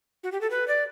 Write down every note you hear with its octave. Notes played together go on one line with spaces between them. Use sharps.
F#4
G4
A4
B4
D5